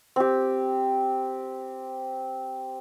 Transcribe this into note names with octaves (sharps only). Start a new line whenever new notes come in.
C4 G4